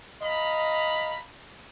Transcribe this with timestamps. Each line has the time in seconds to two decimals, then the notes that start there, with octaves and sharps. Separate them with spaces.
0.22 D#5 F5 A#5 B5